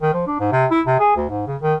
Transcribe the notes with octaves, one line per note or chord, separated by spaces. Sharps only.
D#3
F3
D4
G#2
C3
E4
C3
G#4
D2
G#2
C#3
D#3